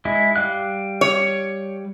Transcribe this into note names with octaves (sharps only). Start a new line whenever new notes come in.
G#3 E4
G3 F5 F#6
C#5